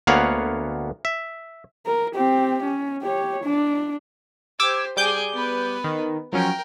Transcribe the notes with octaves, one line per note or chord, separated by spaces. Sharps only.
D2 A#3 B3 C#5 F5 F#5
E5
A#4
C4 G4
C#4
G4 C#5
D4
G4 C5 D6 E6 G#6
G3 G#4 D6 G6
B3 B4
D#3
F3 F#3 C#4 A#4 G5